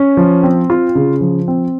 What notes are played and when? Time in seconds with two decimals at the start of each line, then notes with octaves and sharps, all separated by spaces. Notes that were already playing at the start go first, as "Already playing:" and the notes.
Already playing: C#4
0.17 F3
0.43 C4
0.70 F4
0.95 C#3
1.21 F3
1.48 C4